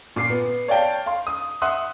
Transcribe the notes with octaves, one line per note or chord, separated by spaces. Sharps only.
A#2 D6 C7
B3
C#5 D5 F5 G5 A5
F5 C6
D#6
E5 F#5 C6 D#6 E6 F#6